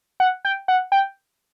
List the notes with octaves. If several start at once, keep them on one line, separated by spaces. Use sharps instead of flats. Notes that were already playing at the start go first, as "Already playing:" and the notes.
F#5
G5
F#5
G5